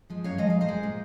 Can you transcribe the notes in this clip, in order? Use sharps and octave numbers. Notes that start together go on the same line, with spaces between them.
F3 G#3
F#2 C#5 F5
F3 G#3 D#5
A#2 F5
C5 D#5
G#3
A#2